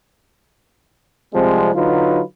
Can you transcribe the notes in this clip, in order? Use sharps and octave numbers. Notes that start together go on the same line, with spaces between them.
C3 F3 G3 G#3 C4
D3 F#3 D#4 F4 B4